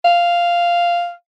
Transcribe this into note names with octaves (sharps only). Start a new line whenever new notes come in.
F5